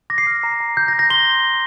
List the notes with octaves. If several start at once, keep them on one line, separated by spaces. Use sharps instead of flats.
D6 A#6
C7
F6 A#6
A#5
A#5
G6
A#6
G6
A#6
C6 G7